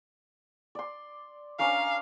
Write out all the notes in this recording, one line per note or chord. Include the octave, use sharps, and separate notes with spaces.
D5 C6
C#4 D4 A#4 F5